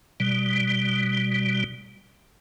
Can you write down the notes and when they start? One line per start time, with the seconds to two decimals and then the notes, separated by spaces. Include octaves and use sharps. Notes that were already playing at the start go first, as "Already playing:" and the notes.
0.20 B2 G3